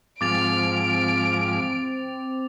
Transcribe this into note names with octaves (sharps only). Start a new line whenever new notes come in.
G#2 F3 C4 D6 A6 D7 F7